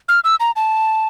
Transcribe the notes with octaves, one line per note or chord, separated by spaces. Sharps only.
F6
E6
A#5
A5